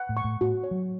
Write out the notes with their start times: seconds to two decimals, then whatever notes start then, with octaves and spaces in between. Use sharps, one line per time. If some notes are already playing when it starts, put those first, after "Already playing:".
Already playing: F#5
0.09 A2
0.17 C#6
0.24 A2
0.41 A2 F#4
0.64 C#5
0.71 F#3